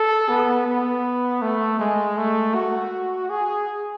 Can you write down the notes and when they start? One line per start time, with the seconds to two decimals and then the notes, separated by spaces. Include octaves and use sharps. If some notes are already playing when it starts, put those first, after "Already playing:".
Already playing: A4
0.29 B3
0.67 B3
1.42 A3
1.80 G#3
2.17 A3
2.55 F#4
3.30 G#4